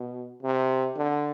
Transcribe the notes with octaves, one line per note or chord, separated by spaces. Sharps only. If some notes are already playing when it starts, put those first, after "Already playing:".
Already playing: B2
C3
D3